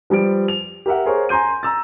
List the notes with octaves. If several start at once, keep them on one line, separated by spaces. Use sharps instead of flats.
F3 G3 B4 D7
F7
G4 A#4 E5 F#5
G#4 A#4 C5 C#5
G#5 A#5 C6 G6 D#7
A#5 E6 A6